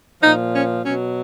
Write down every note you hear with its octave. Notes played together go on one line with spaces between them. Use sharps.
A#2 F3 D#4
C#4
B2 F#3 C#4